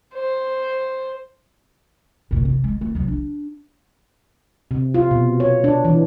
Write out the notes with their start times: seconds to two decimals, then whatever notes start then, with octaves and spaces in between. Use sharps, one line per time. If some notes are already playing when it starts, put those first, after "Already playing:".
0.14 C5
2.31 F1 A#2
2.45 C3
2.64 G#3
2.81 A3
2.95 C2 F#3
3.08 D4
4.71 C3
4.94 F4
5.11 B2
5.40 C#5
5.64 D4
5.85 E3